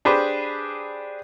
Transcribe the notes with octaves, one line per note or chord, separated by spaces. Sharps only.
D4 G4 G#4 B4 C5